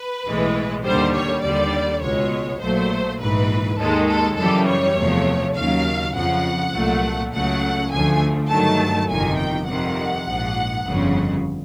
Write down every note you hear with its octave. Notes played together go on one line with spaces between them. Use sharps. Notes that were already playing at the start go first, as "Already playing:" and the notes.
Already playing: B4
B1 A2 E3 G#3
D#2 D3 G3 C5
C#5
D#2 D3 G3 D5
C#2 B2 G#3 C#5
A#1 A#2 F#3 A3 C5
A#1 G#2 E3 B4
D#2 D#3 G#3 A4
A4
F#2 C#3 E3 G3 A4
C#5
E2 C3 F3 A3
D#2 C#3 F#3 F5
F2 C#3 F3 F#5
C2 A#2 F#3 A3
C#2 C#3 F#3 A3 F#5
D2 D3 F3 A3 G#5
G2 D#3 F#3 A3 A5
G1 F2 C3 D#3 G#5
G5
F2 C3 D#3 G3 F#5
A#1 G#2 F3
G1 F2 C#3